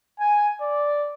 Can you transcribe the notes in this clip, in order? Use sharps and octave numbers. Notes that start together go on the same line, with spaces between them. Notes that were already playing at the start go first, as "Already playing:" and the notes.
G#5
D5